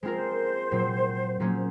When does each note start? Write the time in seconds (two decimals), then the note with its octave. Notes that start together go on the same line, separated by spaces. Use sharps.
0.03 G#3 C4 F4 A#4 C5
0.71 A#2 F#3 C4
1.40 A#2 F#3 A#3 C#4 G#4 C5